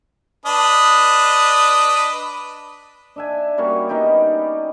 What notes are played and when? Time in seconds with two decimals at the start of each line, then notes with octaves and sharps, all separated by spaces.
0.46 D4 B4 D#5
3.16 D4 E5 G#5
3.58 G3 A#3 C#4 F#4
3.89 G3 B3 D#4 G4